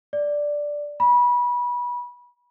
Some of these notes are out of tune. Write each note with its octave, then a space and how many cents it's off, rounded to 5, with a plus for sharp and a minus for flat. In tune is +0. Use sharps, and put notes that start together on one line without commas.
D5 +0
B5 -25